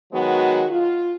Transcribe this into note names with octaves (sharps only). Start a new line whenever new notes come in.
D#3 F#3 G#3 B3 F#4
F4